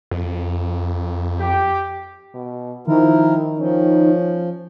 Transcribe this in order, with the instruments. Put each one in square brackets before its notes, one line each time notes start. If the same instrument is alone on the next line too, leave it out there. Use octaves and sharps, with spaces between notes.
[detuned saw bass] F2
[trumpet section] G4
[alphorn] B2
[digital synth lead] D#3 [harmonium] F3 A#4 [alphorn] E4
[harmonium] F3 [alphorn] C#4